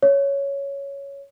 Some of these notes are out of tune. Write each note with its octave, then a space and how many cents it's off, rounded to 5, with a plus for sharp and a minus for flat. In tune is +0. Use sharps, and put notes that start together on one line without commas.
C#5 +5